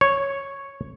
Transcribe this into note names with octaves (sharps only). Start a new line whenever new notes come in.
C#5